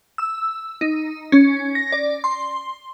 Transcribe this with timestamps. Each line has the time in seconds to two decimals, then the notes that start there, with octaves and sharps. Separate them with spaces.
0.18 E6
0.81 D#4
1.32 C#4
1.75 A#6
1.92 D5
2.24 C6